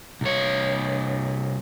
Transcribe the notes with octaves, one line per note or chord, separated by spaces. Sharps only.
C2 C#5